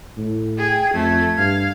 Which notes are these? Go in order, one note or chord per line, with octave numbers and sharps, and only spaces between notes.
A2
G#4 G5 G#6
F2 A3 G#6
G2 F5